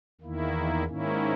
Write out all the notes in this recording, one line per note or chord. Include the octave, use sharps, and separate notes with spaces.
E2 D#3 A#3 E4
G#2 D#3 A#3 C#4 E4